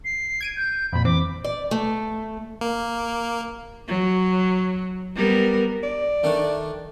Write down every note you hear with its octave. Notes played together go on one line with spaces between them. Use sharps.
C7
G#6 D7 D#7
G6
F2 A#2 B5
E3 C4 D6
D5
A3
A#3
F#3
G3 B3 A#4
D5
D#3 A3 D4